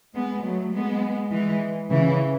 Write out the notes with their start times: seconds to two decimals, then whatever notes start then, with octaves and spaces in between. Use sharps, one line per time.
0.14 G#3 B3
0.44 F#3 A3
0.73 G#3 B3
1.31 E3 G#3
1.90 C#3 E3